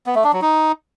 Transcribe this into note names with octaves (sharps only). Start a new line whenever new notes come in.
B3
A3
D4
F#3
D#4